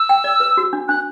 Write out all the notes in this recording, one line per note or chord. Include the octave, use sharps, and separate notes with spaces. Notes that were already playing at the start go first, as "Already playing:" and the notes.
Already playing: E6
G5
D5
B4
F#4
D4
D4 F#6